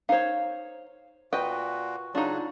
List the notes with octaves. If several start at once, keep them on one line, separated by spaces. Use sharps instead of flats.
D#4 C5 C#5 F5
A#2 F#4 B4 D#5 G5
C#3 F#3 D4 D#4 F4 F#4